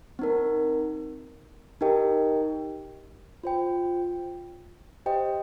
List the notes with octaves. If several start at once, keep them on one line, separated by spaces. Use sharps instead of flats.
C4 D#4 A#4
D#4 G4 A#4 D#5 G5
F4 C5 G5
G4 C5 D#5 G5